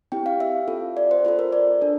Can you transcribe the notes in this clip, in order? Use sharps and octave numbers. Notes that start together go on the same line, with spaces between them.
C4 E4 G4 G5
F5
E5
C4 F4 A4
D5
C5
C4 F4 A4 C5
A#4
D5
D4 A4